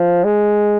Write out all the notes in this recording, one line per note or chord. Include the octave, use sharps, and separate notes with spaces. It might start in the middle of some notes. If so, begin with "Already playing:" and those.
Already playing: F3
G#3